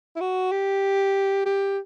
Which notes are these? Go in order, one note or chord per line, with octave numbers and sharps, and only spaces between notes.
E4
F#4
G4
G4